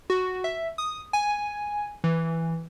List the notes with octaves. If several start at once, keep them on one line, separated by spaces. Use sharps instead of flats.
F#4
E5
D#6
G#5
E3